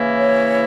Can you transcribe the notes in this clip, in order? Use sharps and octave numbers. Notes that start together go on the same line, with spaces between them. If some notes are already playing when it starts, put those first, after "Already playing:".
Already playing: C#3 E3 A#3 E4
C#5